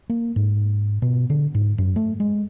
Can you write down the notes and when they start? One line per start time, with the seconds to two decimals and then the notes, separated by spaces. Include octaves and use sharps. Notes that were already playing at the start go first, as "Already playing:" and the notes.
0.09 A#3
0.36 G#2
1.02 B2
1.30 D3
1.55 G#2
1.78 F#2
1.96 A3
2.20 G#3